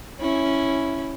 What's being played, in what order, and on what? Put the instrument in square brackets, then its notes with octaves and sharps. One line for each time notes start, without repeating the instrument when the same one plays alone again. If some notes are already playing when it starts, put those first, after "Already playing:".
[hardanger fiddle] C#4 E4